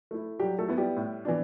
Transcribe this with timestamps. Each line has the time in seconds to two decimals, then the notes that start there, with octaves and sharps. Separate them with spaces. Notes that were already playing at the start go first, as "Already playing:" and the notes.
0.11 A3 E4
0.40 F#3 G3 G4
0.58 A3 A4
0.68 B3 E4
0.78 G3 G4
0.97 A2
1.25 E3 B3 D4